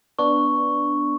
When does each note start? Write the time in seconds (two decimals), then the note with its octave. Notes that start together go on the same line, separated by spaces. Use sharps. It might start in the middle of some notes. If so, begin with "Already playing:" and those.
0.19 B3 D4 C#6